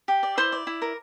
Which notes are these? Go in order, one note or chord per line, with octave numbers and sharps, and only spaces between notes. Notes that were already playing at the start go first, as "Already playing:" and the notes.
G4
D5
E4 C5 C6
D5
E4
A#4